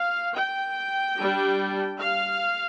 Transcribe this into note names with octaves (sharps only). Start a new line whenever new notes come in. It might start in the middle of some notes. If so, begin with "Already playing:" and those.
Already playing: F5
G5
G3 D4
F5